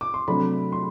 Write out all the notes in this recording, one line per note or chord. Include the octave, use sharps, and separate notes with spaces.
D6
C6
C3 F#3 A3 D4 B5
C6